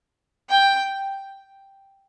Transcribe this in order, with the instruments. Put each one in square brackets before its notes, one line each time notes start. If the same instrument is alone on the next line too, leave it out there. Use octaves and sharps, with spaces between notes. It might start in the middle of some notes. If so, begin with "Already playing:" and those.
[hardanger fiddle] G5